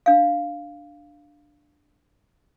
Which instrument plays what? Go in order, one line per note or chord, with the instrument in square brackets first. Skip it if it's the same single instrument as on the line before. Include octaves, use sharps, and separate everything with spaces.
[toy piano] D4 F5